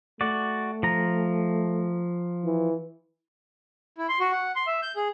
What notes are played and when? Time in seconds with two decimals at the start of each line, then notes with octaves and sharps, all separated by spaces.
0.21 A3 F#4 D5
0.83 F3 A#5
2.44 E3
3.97 E4
4.09 C6
4.20 F#4
4.32 F#5
4.56 C6
4.67 E5
4.82 G6
4.96 G#4